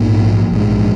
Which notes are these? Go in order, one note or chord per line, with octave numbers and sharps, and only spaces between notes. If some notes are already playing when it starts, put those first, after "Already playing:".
Already playing: A#1 G#2 A#3
A#1 G#2